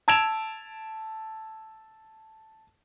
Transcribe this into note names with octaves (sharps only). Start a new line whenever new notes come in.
A5 E6 G#6 D7 E7 F7